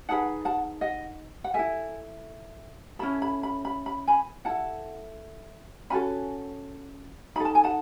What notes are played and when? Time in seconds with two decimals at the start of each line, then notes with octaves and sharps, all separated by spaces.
0.09 D#4 G#4 B4 F#5 A5
0.45 F#5 A5
0.81 D#5 F#5
1.44 F#5
1.54 E4 A4 E5 G#5
2.99 C#4 E4 A4 B5
3.22 B5
3.43 B5
3.65 B5
3.86 B5
4.07 G#5 B5
4.45 E4 A4 F#5 A5
5.90 C#4 F#4 A4 G#5 B5
7.36 D#4 B5
7.40 A4
7.45 A5
7.55 G#5
7.64 F#5 A5